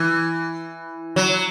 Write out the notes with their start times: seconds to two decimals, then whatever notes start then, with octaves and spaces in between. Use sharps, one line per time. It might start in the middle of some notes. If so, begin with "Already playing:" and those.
Already playing: E3
1.16 F#3